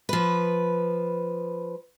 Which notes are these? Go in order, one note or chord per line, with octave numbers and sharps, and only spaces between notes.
F3 B4